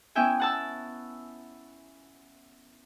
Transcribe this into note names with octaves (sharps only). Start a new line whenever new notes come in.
B3 C#4 E4 E5 G5 G#5
F#5 A5 E6